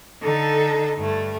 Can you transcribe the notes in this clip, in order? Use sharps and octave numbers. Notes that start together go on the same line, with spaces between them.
D3 D#4 A4
G2 A3